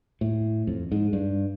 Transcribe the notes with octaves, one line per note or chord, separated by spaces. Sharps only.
A2
F2
G#2
G2